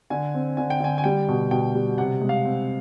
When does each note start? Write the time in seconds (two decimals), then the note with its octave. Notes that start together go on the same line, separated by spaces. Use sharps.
0.10 D3 G#5
0.34 C4
0.57 D3 G#5
0.70 G5
0.80 D3 G#5
0.98 G#5
1.04 G3 G5
1.28 B2
1.51 B2 G5
1.75 G3
1.98 C3 F#5
2.21 G#3
2.29 F5
2.45 C4